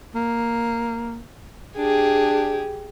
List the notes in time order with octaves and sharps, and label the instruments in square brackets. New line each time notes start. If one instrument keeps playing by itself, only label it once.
[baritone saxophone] A#3
[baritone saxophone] D4 [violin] G4 G#4